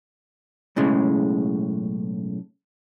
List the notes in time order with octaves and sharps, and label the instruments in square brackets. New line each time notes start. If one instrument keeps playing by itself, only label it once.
[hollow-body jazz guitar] B1 A2 C#3 G#3